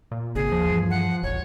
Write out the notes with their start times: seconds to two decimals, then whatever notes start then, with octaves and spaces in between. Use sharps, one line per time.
0.11 A#2
0.35 G#1 C#3 G#4
0.52 D#2 F3
0.70 G2 E3
0.90 F#5
1.23 D#1 A1 C#5